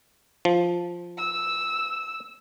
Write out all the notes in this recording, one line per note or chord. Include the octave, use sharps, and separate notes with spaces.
F3
E6